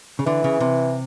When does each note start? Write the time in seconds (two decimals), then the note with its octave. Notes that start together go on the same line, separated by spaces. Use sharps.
0.19 C#3
0.26 D3 E3
0.44 C#3
0.60 C3